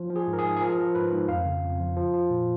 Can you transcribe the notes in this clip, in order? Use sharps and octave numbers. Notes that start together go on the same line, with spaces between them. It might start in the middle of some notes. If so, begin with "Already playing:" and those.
Already playing: F3
F3
G#4
G#2
A#4
G#4
G#2
G#4
F3 A#4
F3
G#2 B4
G#2
F2 F5
C#3
F2
F3
F3
F3
A#2